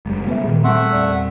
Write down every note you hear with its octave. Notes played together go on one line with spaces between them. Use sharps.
F#1 G3 G#3
C#3 G3 A3 B3 B4 E5
E1 A#2 D#3
G3 A3 C4 E5 F#5 C6 C#6
E2 D5 E6